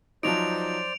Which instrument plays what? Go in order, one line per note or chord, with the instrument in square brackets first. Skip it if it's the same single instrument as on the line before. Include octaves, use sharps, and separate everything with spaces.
[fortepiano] F3 F#3 D#4 [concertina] C5 D5 [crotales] D7 F7